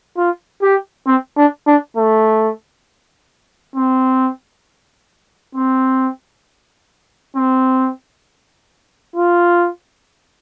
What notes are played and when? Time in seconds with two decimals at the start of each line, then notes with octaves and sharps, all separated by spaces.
0.17 F4
0.62 G4
1.07 C4
1.37 D4
1.67 D4
1.97 A3
3.76 C4
5.55 C4
7.36 C4
9.16 F4